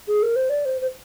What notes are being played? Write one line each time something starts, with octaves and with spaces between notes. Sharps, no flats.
G#4
A#4
C5
D5
C5
C5